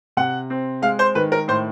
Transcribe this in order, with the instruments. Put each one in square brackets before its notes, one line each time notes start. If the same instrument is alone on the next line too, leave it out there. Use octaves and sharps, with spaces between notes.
[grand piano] C3 F#5
C4
G#3 F5
C5
D#3 B4
A#4
A2 C5